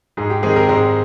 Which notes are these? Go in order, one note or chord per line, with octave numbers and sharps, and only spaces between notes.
G#2 G#4
G4
D#3 G#3 C4 G#4
G4 A#4
G#2 G#4 C5